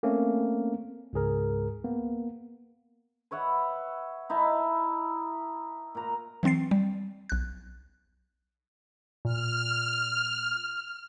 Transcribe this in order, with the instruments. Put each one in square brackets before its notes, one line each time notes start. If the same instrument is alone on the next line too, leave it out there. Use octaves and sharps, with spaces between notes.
[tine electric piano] A3 A#3 C4 C#4
C#2 G#2 G#4 A#4
A#3 B3
[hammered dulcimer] B4 C#5 E5 F#5
D#4 E4 E5 A5
A#2 A#5
[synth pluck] E3 F#3 C4 A6 C7
G3
B1 F#6
[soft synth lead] A#2 [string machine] F6